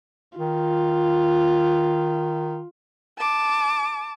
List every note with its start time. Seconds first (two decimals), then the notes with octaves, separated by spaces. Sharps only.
0.39 D#3 F4
3.18 A5 D6